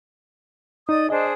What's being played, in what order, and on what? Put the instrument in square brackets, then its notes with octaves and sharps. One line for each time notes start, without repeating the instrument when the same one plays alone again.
[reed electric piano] D#4 [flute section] D5 D#5 D#6
[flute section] D4 G#4 C5 [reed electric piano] D#5